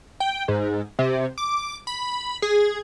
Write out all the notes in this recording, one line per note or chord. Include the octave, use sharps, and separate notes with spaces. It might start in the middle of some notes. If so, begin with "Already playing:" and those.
G5
G#2
C3
D6
B5
G#4